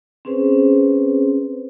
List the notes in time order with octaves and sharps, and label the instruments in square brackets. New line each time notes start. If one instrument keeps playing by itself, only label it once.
[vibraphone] C4 C#4 G#4 B4 C5